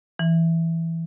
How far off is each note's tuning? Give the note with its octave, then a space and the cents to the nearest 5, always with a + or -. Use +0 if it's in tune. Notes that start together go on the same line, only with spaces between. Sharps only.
E3 +0